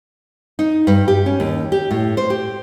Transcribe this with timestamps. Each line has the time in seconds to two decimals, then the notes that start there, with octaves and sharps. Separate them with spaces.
0.59 D#4
0.87 G2
1.08 G4
1.26 C#4
1.40 D#2
1.72 G4
1.91 A2
2.17 C5
2.30 G4